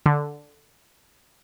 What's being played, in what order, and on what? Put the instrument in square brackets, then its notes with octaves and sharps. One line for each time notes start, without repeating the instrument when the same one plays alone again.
[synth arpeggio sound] D3